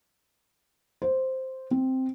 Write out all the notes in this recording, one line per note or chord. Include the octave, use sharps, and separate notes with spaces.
C5
C4